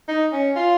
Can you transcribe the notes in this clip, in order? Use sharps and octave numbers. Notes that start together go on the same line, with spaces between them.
D#4
C#4
F4